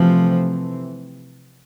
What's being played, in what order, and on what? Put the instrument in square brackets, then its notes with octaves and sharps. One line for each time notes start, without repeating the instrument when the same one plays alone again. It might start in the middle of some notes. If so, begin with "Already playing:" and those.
Already playing: [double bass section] C3 E3 A3 C4 [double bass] F3